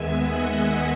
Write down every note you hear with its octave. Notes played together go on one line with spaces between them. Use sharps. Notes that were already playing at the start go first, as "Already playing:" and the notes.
Already playing: D#2 D#3 G#3 B3 E5 G#5
D#5 F#5